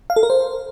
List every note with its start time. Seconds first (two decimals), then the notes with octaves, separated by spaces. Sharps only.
0.10 F5
0.16 A4
0.23 A#4
0.30 C5